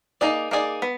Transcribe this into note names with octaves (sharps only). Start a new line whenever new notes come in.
A#3 D#4 G#4 D5
A#3 D#4 G#4 D5
B3